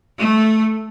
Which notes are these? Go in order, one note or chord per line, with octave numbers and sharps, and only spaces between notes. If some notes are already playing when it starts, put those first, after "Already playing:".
A3